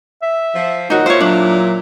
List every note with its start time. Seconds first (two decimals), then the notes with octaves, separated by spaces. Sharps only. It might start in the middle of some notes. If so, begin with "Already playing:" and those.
0.22 E5
0.55 F3
0.90 A#2 D#3 F#3 D#4 F#4
1.06 A#2 E4 F4 C5 C#5 F5
1.20 F#3 D4